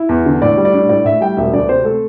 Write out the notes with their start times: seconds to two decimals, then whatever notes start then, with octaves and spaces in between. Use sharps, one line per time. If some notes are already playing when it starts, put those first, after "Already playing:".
Already playing: E4
0.09 E2
0.26 D3
0.42 A2 D5
0.57 G3
0.65 D5
0.74 D4
0.89 A2 D5
1.05 A2 E5
1.21 G3 G5
1.37 E1 E5
1.53 D2 D5
1.69 C3 C5
1.85 A3 A4